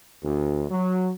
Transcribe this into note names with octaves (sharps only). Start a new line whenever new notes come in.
D2
F#3